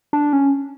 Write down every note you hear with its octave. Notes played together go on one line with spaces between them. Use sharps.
D4
C#4